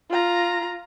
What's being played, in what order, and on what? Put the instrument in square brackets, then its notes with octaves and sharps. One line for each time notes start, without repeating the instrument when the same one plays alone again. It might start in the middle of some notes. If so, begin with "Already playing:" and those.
[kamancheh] F4 A#5